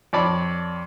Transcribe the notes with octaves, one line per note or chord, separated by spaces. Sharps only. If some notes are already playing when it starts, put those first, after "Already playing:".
F2 C#5 D5 A5 B5